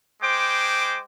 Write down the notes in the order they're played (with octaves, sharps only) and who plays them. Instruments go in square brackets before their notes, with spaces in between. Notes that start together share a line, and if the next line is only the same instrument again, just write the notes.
[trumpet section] G#3 C5 G5 D6